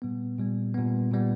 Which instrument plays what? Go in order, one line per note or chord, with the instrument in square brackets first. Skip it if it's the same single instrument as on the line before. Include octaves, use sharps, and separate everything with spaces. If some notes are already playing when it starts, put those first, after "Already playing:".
[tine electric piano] A#2 G3 B3
A#2 G3 B3
A#2 G3 B3
A#2 G3 B3